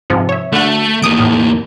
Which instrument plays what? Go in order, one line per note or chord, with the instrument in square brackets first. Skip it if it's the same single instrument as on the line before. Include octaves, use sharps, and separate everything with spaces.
[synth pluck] G#2 C3 F3
C#5 E5
[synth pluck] D3 F#4 [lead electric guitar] A3
[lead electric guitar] E2 A#3 [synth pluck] D#6 D7
[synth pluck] A2